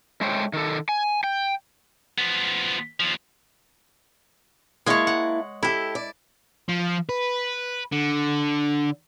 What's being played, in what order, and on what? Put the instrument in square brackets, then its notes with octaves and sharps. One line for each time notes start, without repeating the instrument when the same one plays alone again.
[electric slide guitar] G#3 A3 C5 C#5 G5
D#3 A4
G#5
G5
[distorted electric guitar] F3 B3
D#2 F3
[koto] G#3 C#5 [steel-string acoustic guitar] A#3 E4 A5
[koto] F#5
[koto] E4 [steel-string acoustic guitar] G4 A4
[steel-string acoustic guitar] D5
[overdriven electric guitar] F3
B4
D3